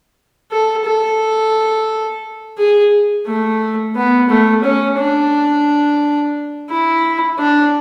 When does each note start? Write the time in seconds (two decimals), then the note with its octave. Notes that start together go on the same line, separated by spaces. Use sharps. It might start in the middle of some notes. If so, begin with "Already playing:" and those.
0.51 A4
0.85 A4
2.58 G#4
3.27 A3
3.95 B3
4.29 A3
4.64 C#4
4.98 D4
6.70 E4
7.39 D4